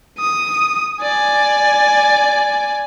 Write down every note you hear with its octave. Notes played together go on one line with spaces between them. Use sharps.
D#6
D5 G#5